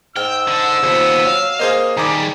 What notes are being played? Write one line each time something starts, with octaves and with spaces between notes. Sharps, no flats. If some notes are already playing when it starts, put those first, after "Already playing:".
G#2 G5 E6 F6
D3
D#2 F3 B3
F#3 F5
A#3 G#4 C5 D#5
D#3 G3 G#4 A#5 D6